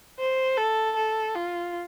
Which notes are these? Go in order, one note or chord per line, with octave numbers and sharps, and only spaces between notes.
C5
A4
A4
F4